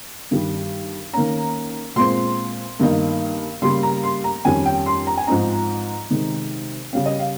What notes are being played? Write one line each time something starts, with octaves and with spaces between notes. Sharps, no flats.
G2 D#3 G3
D#3 A#3 C#4 A#5
A#2 G#3 C4 C6
G2 D#3 A#3 D#4
C#3 G3 A#3 C6
A#5
C6
A#5
F2 D#3 G3 C#4 G#5
G5
C6
A#5
G#5
G#2 F3 C4 D#4 A#5
C3 D#3 G#3 D#4
C#3 G3 C#4 F5
D#5
F5